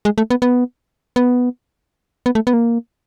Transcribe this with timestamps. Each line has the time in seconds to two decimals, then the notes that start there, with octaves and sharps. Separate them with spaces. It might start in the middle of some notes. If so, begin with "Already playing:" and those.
0.05 G#3
0.18 A3
0.30 B3
0.42 B3
1.16 B3
2.26 B3
2.35 A3
2.47 B3
2.53 A#3